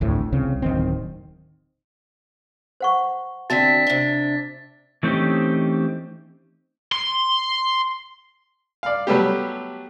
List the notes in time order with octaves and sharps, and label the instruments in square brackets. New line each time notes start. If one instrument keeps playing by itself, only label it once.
[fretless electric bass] G#1 D2 A2
C2 C#3 C4
D1 D#3 C4
[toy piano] C5 F#5 C#6
[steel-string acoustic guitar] D3 C4 E5 [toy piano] F#4 A5 [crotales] A6 B6
[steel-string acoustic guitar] C3 D4
[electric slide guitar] E3 A3 C4 C#4 D#4 G4
[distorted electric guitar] C6
[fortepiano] D5 F5
F#3 G3 A3 B3 G4